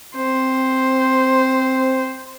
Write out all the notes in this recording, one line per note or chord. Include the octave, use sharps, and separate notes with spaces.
C4 C5